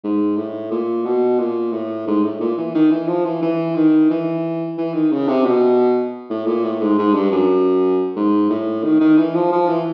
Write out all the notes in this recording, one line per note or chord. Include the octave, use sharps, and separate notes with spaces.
G#2
A2
A#2
B2
A#2
A2
G#2
A2
A#2
E3
D#3
E3
F3
E3
E3
D#3
E3
E3
D#3
C#3
C3
B2
A2
A#2
A2
G#2
G#2
G2
F#2
G#2
A2
D#3
D#3
E3
F3
F3
E3